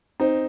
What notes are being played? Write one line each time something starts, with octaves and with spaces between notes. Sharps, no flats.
C4 D#4